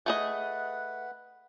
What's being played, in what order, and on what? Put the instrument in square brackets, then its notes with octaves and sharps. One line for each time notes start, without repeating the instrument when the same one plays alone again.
[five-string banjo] A3 G#4 D#5 [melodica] B4 F#5